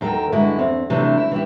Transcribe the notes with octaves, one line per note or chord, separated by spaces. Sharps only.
D#2 F#3 A4 A#4 G5
G2 D3 G#3 E4 F#4
E2 C4
C3 E3 F#3 A3 D4
E4
E3 E4 F4 G4